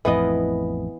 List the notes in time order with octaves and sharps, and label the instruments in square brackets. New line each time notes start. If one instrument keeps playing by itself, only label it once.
[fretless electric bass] A1 F2 A2 [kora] E3 B3 D#5